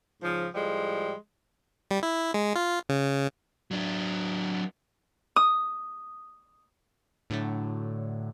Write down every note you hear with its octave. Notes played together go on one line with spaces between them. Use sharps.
G#2 C#3 F3
A2 F3 G3 G#3
G3
E4
G#3
F4
C#3
F#3 D4
D#6
A2 D3 F#3 A3